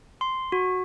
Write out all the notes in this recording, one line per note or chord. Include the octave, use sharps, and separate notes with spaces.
C6
F#4